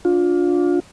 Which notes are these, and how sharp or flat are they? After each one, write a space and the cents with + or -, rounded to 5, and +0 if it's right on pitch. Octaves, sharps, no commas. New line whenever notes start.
D4 -15 F4 +25